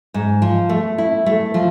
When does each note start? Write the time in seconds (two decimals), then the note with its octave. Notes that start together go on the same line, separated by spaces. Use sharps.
0.14 G#2
0.42 F3
0.69 A3
0.98 E4
1.26 A3
1.54 F3